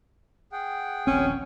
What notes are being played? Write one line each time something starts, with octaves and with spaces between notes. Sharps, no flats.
G#4 F#5 G5
D#1 A#1 C4 C#4